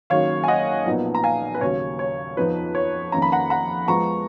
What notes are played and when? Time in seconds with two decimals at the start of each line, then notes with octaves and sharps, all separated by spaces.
0.10 F#1 F#2 D#3 F#3 C#5 F5
0.44 G#5
0.48 D#5 F#5
0.86 B1 A#2 F3 B3 D#4
1.15 A#5
1.24 F5 G#5
1.55 B4
1.61 D#2 C#3 F#3 C#4 C#5
1.99 C#5
2.37 F2 F3 B3 D#4 B4
2.75 C#5
3.12 F2 D#3 A#3 C#4 A#5
3.22 B5
3.32 F#5 A#5
3.50 F#5 A#5
3.88 F2 F3 G#3 B3 A#5 C#6